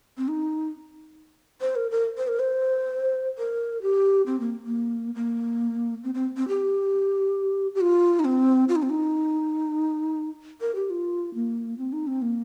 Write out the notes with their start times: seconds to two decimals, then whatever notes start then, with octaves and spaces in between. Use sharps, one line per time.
0.18 C4
0.28 D#4
1.61 C5
1.76 A#4
1.91 A#4
2.17 C5
2.28 A#4
2.39 C5
3.38 A#4
3.82 G4
4.26 C4
4.40 A#3
4.66 A#3
5.15 A#3
6.04 C4
6.14 C4
6.37 C4
6.48 G4
7.75 G4
7.81 F4
8.20 D#4
8.25 C4
8.69 F4
8.76 D#4
8.82 C4
8.90 D#4
10.61 A#4
10.75 G4
10.90 F4
11.34 A#3
11.78 C4
11.93 D#4
12.07 C4
12.22 A#3